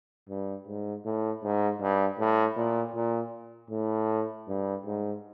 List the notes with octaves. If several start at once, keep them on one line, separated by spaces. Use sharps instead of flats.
G2
G#2
A2
G#2
G2
A2
A#2
A#2
A2
G2
G#2